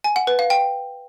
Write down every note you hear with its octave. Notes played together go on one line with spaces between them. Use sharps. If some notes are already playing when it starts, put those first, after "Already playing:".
G#5
F#5
B4
F5
G5